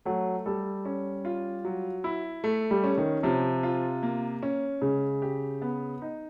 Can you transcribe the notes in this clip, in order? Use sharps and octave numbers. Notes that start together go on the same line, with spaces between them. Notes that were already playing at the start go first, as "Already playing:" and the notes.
F#3 A3
G3 A4
C#4
F4
F#3
E4
A3
G3
C#4
D#3
C3 F3
F4
A#3
C#4
C#3 G#3
G4
B3
D#4